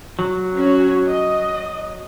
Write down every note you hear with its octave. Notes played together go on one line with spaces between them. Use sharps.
F#3
C#4 F#4 C#5
D#5